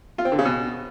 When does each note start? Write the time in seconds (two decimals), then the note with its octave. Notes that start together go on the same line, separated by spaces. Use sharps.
0.18 F4
0.25 C4
0.32 D3
0.39 C#3
0.45 B2